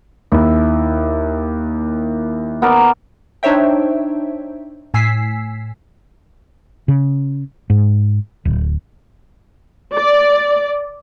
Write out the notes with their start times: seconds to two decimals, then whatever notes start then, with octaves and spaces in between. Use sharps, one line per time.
0.32 D#2 E4
2.62 B3 A#4 D5
3.43 D4 D#4 C5 C#5 E5 G5
4.94 A2 G#5 E6 B6 C7
6.88 C#3
7.70 G#2
8.45 D1
9.95 D5